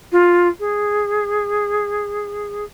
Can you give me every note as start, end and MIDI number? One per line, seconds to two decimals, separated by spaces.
0.12 0.48 65
0.59 2.64 68